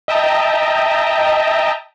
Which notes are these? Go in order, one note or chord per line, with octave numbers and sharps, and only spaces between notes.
D#5 E5 G5 A5 A#5